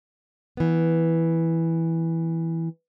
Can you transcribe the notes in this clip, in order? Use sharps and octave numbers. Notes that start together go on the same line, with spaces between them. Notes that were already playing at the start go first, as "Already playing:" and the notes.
E3 B3